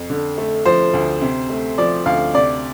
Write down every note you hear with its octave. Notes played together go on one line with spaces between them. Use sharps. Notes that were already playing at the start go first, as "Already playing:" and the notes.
Already playing: F2
D3
A3
F3 C5
D2
C3
A3
F3 D5
D2 F5
C3 D5